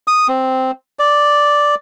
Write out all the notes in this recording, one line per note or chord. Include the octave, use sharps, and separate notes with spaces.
D#6
C4
D5